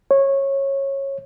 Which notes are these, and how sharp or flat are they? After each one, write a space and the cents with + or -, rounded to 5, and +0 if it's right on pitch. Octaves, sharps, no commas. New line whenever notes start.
C#5 -20